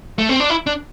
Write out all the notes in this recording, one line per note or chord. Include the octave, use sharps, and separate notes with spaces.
A3
C4
D4
E4
D4